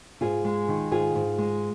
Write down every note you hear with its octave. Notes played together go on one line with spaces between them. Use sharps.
G#2 F4 G#4
G#3
D#3
G#2 F4 G#4
G#2
G#3